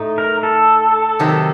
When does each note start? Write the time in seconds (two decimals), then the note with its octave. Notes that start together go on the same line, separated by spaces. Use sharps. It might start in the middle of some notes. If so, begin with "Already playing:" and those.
Already playing: A2 A3 D#4
0.18 A#4
0.43 A4
1.19 C3 D#3 F#3